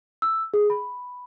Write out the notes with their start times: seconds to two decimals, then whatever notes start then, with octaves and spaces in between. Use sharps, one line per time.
0.22 E6
0.54 G#4
0.70 B5